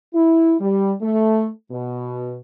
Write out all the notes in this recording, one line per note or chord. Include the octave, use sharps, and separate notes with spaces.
E4
G3
A3
B2